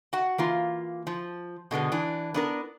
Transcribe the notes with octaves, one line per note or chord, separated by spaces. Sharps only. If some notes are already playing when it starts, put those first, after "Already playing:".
F#4 F#5
E3 A#3 F4
F3
B2 D3 G#3 B3
E3 D4
B3 D4 A#4